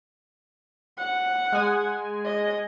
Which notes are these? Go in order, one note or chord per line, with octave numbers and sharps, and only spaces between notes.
F#5
G#3 G#5
D#5